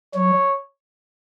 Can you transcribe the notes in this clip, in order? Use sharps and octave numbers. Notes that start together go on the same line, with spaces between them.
F#3 C#5